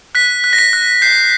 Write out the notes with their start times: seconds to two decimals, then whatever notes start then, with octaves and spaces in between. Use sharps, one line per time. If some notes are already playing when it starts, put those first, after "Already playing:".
0.15 F#6 B6
0.44 F#6
0.53 A#6
0.59 B6
0.73 F#6
1.02 G6 C7